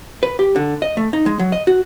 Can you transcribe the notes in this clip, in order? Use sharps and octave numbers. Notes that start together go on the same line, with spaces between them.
B4
G4
D3
D#5
A3
D#4
G#3
F#3
D#5
F#4